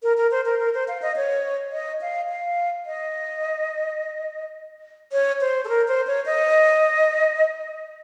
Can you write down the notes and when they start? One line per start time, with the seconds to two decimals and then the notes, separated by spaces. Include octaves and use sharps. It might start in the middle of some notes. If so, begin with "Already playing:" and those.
0.03 A#4
0.17 A#4
0.31 C5
0.46 A#4
0.60 A#4
0.74 C5
0.88 F5
1.02 D#5
1.16 C#5
1.73 D#5
2.01 F5
2.30 F5
2.86 D#5
5.12 C#5
5.41 C5
5.65 A4
5.69 A#4
5.88 C5
6.07 C#5
6.26 D#5